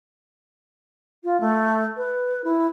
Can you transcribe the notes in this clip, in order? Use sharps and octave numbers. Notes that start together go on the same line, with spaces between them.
F4
A3
B4
E4